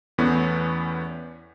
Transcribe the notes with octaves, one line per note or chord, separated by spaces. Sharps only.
E2 A2 B3 C#4